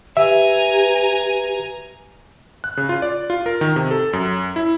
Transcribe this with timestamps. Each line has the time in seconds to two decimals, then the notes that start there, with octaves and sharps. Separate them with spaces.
0.17 G4 B4 E5 G#5 A#5
2.64 F#6
2.77 C#3
2.89 F4
3.02 D5
3.30 F4
3.46 A#4
3.61 D#3
3.76 C3
3.91 A4
4.13 F#2
4.56 E4